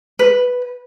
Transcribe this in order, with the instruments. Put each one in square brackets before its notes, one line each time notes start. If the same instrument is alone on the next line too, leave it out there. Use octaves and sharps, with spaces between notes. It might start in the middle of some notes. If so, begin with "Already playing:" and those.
[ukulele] B4